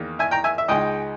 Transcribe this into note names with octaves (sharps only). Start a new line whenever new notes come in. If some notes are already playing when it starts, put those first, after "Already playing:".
Already playing: E2 D#3 A#3
E5 G#5
G5 A#5
E5 G#5
E5
C#2 C#3 G#3 D#4 D#5 G5